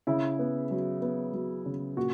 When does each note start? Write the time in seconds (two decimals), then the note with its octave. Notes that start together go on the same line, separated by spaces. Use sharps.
0.07 C#3 E4
0.39 B3
0.71 F#3
1.02 B3
1.33 F#3
1.66 C#3
1.96 A#2 F#4